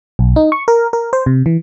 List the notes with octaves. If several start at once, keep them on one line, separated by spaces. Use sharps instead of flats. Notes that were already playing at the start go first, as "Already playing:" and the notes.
B1
D#4
C#6
A#4
A#4
C5
C3
E3